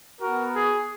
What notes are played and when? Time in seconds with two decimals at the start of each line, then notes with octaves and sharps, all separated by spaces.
0.21 B3 F#4 A#4
0.54 G#4